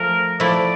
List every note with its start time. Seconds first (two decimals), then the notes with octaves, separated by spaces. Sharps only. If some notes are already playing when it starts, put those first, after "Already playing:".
Already playing: F3 A3 A#4
0.40 F3 A3 E4 D5